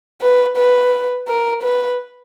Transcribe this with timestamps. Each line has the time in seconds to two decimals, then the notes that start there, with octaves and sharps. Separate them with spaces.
0.22 B4
0.57 B4
1.28 A#4
1.63 B4